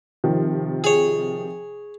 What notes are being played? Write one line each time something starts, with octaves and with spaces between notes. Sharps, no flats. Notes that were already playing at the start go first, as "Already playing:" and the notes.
C3 D#3 F3
G#4 C#5